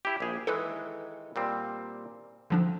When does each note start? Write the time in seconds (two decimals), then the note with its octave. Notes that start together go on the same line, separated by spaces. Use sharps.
0.05 E4 G4
0.20 A#1 G#4
0.47 D#3 E3 G#3 A4 B4
1.36 A#2 G3 C4
2.50 D3 F3 C4 D4